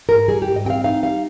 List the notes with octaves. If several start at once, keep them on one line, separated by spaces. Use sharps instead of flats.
G#2 A#4
G3 G#4
G4
G#2
D#5
C4 F5 G5
D#4 F5
G3 F5